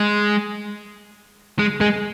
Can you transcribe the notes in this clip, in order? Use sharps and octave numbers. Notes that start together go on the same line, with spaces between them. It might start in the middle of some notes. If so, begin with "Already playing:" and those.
Already playing: G#3
G#3
G#3